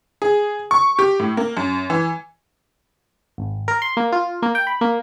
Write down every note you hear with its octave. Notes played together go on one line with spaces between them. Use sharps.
G#4
C#6
G4
A2
A#3
F#2
E3
G#1
A#4
C6
A#3
F4
A#3
G5
B5
A#3